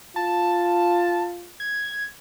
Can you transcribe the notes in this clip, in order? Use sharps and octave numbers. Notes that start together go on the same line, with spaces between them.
F4 A5
G#6